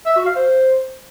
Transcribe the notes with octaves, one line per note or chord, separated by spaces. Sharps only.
E5
F#4
F5
C5